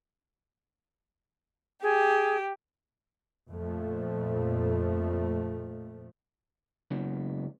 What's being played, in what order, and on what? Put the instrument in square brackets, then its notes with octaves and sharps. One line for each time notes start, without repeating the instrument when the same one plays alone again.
[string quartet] G4 [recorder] G#4
[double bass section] F2 A#2 F3 A3
[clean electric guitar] C#2 F#2 C#3 F#3 B3